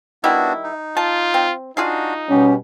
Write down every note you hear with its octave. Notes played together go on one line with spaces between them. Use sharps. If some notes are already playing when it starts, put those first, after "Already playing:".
D#3 G3 B3 D4 E4 F#4
D#4
F4 A5
C4
D4 D#4 F4 F#4 G#4 F5
B2 G3 B3 C#4 G4